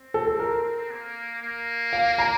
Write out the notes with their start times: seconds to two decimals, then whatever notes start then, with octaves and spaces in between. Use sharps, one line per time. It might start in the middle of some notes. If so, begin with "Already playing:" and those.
Already playing: C4
0.14 A4
0.27 A4
0.39 A#4
0.91 A#3
1.42 A#3
1.93 F5
2.18 A#5